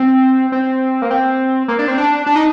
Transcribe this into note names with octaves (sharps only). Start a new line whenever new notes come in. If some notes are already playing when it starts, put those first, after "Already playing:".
Already playing: C4
C4
A#3
C4
A#3
D4
C4
D4
D4
D#4